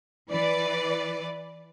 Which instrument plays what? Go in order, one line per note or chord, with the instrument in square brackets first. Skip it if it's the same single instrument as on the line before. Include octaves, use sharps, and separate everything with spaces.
[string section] E3 B4 D5